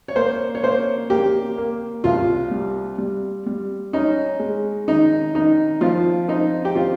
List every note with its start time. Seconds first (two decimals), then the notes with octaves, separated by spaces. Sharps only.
0.08 C#5
0.15 A#3 C5
0.55 C#5
0.63 A#3 C5
1.10 A#3 G4
1.58 A#3
2.04 C2 F4
2.51 G3
2.98 G3
3.46 G3
3.93 C#4 D#4
4.40 G#3
4.88 D#3 D#4
5.34 D#3 D#4
5.81 F3 F4
6.28 C4 D#4
6.65 G4
6.75 C4 F4